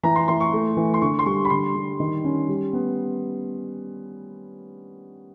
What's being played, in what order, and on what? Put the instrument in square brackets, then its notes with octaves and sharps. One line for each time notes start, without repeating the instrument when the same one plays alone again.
[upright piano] E3 A#5
C6
E3 C6
C#6
A3
E3
C6
D3 C#6
C6
G3 C#6
B5
D3 C6
G3
D#3
C#4
G3
B3